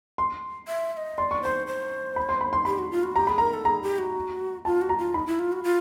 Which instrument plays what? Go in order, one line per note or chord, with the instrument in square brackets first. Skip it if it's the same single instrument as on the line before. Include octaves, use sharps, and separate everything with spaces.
[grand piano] C6
[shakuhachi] E5
E5
D#5
[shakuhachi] D5 [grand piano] C6
[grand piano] C#6
[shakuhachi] C5 [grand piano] C6
[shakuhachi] C5
[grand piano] B5
C6
B5
C6
[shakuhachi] G4 [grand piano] B5
[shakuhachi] F#4
F4
F#4
[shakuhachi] G4 [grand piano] A#5
[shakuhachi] G#4 [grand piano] B5
[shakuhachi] A#4 [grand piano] A#5
[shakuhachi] A4
[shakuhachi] G#4 [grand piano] A#5
[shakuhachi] G4
F#4
[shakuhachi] F4 [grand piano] A5
[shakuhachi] F#4
[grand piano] A#5
[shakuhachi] F4
[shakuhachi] D#4 [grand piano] B5
[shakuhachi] E4
F4
F#4
F4